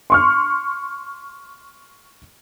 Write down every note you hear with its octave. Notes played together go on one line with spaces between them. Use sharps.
C6 C#6 F6